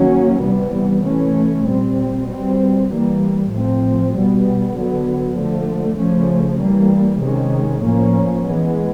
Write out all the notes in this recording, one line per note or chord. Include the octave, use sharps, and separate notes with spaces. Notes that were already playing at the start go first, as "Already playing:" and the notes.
Already playing: D#3 F#3 A#3 C#4
C3 E3 G3 B3
E3 A3 C#4
A#2 G3 C4
B2 G3 C4
E3 G3 A#3
A2 F3 A3 C4
B2 G3 B3
D3 F#3 B3
D3 F3 A3
C#3 F3 A3 C#4
E3 G3 A#3
C3 D#3 G#3 C#4
A2 F3 A#3 C#4
E3 G#3 B3